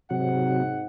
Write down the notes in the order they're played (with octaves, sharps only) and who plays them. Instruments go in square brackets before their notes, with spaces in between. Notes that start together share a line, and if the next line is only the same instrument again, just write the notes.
[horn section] G#2 F#5 [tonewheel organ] C3 F#3